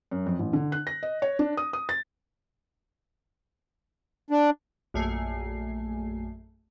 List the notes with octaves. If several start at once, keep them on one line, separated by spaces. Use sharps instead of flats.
F#2
F2
A1
D3
F#6
A#6
D#5
C#5
D4
D#6
D#6
A6
D4
A#1 F#2 A3 G#5 C7